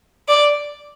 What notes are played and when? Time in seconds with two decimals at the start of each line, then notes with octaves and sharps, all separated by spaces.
0.28 D5